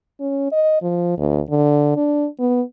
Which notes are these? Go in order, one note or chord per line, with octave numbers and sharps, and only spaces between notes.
C#4
D#5
F3
D2
D3
D4
B3